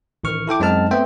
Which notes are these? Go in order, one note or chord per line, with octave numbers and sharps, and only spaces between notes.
A1 D#3 C#6 F6
E4 A4 G5 D6
F#2 G#3 C4 D#4 A5 F6
A3 B3 C4 C5 E5 G5